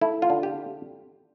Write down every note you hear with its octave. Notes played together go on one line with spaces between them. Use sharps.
A3 E4
F4
D3
G4